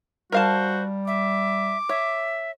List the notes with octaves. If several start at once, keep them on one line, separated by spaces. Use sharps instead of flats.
G3 F#4 A#4 C5 F5 A5
E5 D6
C#5 E5